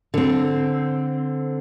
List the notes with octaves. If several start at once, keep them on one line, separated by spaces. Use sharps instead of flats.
D3 C4